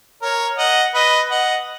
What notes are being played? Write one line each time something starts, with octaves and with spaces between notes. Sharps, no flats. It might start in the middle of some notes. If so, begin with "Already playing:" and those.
A#4 C#5
D#5 F#5
B4 D#5
D#5 F#5